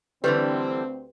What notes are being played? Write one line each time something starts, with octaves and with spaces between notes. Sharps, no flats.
D2 D3 E3 G3 C4 G4 B4 C5